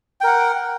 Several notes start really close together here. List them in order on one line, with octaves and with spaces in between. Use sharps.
G5 A#4 F#5